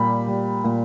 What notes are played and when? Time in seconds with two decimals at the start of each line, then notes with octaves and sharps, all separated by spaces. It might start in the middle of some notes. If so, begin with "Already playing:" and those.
Already playing: A#2 G3 B5
0.28 G3
0.64 A#2